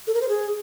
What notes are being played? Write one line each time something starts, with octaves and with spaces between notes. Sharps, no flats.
A4
A#4
C5
G#4